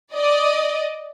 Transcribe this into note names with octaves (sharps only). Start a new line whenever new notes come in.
D5 D#5